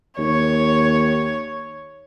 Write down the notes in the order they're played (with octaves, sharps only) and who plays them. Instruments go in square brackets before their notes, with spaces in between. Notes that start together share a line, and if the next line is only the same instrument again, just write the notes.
[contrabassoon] D#2 [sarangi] C#5